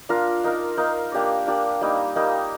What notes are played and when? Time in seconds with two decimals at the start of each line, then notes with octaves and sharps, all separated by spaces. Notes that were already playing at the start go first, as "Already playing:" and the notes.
0.09 D4 F4 A#4 F5
0.44 D#4 A#4 F5
0.77 D#4 A#4 F5
1.12 A#3 D4 G4 D5
1.47 A#3 D4 G4 D5
1.81 G3 A#3 D#4
2.16 G3 A#3 D#4